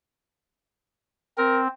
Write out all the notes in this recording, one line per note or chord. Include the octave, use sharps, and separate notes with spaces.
C4 A#4